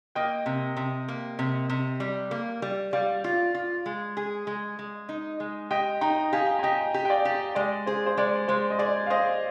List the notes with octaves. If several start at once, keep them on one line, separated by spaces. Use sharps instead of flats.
A#3 D#5 G5
C3
C3
A#3
C3
C3
G3
A#3
G3
G3 D5 F5
F4
F4
G#3
G#4
G#3
G#3
D#4
G#3
G4 D#5 G5
D#4 G5 A#5
G4 F5 G#5
G#5
G4 D#5 G5
G4
G5
D5 F5
G4
G#3 D5
G#4 C5
C5
G#3 D5
G#3 C5
D#5
G#4 D5
F5
G#4 C5 D#5